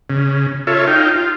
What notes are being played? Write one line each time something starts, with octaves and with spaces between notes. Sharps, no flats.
C#3
F4 A4 C#5 E5
D#4 F5 G5
F4